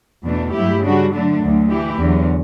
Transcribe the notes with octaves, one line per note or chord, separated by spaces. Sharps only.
E2 B2 A3 D4
G2 F#3 A3 E4 G4
C#3 G3 D4 F#4
D3 F#3 A3 D4
D2 D3 F#3
E3 A3 E4 G4
E2 D3 F#3